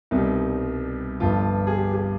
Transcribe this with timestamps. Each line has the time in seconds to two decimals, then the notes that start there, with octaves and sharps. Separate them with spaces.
0.11 C2 B2 G3 D#4
1.20 G1 G2 F3 F4
1.67 G#4
1.75 G4
1.94 G#4